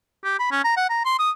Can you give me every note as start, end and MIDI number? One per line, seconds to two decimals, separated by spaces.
0.24 0.38 67
0.39 0.51 83
0.51 0.60 61
0.64 0.75 82
0.77 0.88 78
0.90 1.04 82
1.05 1.14 84
1.19 1.31 87